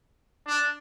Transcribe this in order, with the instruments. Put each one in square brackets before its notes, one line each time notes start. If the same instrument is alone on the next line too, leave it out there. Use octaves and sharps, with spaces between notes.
[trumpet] D4